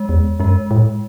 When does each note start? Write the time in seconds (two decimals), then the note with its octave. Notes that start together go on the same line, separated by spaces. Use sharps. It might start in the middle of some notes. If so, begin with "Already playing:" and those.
Already playing: G#3
0.09 E2
0.40 F#2 G#3
0.71 A2